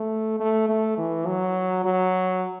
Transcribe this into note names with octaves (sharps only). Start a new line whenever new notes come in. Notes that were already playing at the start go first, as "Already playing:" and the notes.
Already playing: A3
A3
A3
E3
F#3
F#3